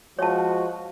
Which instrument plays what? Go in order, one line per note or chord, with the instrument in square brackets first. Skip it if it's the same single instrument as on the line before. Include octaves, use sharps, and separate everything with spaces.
[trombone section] F3 G#3 F#4 [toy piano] C#5 A5